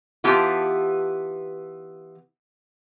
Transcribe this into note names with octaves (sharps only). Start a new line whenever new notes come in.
E3 B3 F4 G4 A5